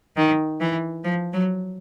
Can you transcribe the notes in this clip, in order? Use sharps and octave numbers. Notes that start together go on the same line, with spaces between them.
D#3
E3
F3
F#3